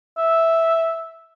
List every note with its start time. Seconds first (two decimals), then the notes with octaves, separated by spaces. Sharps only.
0.18 E5